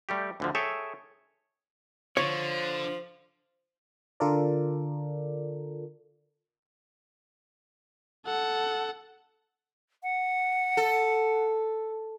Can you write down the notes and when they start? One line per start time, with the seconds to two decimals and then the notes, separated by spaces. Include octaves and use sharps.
0.09 G3 A3 G4
0.40 D2 D3 F3
0.55 G#4 A4 C#5 E5 G5
2.17 D3 F3 C#5
4.20 D3 F4 A4 A#4 D5
8.26 A4 F#5
10.03 F#5
10.77 A4